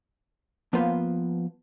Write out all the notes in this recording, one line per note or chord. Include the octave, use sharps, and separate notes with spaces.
F3 A#3 B3 F4 B4 C5